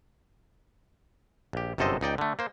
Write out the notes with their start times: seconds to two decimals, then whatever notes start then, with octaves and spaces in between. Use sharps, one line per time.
1.53 A#1 G4
1.78 G1 F#2 C3 A4 C5 D#5
2.01 C#2 D#4 D5 G5
2.18 D3 A3
2.39 A#3 C5